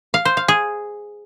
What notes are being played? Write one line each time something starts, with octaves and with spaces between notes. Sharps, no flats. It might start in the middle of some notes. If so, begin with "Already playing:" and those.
F5
C5
F5
G#4